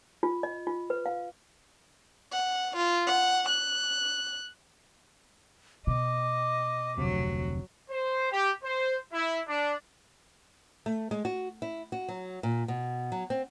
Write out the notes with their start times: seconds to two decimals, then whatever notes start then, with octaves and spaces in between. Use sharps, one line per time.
0.23 F4
0.43 D#5
0.67 F4
0.90 B4
1.06 F5
2.32 F#5
2.76 F4
3.06 F#5
3.48 F#6
5.87 B2 D#5 D6
6.98 F1 D2 C3 F#3
7.90 C5
8.31 G4
8.63 C5
9.13 E4
9.48 D4
10.86 A3
11.11 G#3
11.25 F#4
11.62 E4
11.92 F#4
12.08 F#3
12.43 A#2
12.68 B2
13.12 F#3
13.30 C4